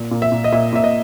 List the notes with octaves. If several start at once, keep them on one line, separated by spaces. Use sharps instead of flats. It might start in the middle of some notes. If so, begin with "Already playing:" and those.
Already playing: A#2
A#2
E5
A#2
D#5
A#2 E5
A#2 E5
D#5